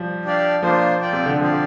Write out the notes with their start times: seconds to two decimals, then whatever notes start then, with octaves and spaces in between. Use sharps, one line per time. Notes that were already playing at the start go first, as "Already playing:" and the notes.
Already playing: F3 G3
0.25 D4 G4 D5 F5
0.62 F3 A#3 D4 F4 C5
1.01 F4 D5 G5
1.13 C3
1.26 D3
1.40 F3 C4 G4 D5 F5